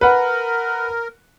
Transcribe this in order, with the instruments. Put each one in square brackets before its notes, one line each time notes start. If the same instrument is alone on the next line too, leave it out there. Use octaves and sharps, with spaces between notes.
[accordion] A#4 [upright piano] B4 F#5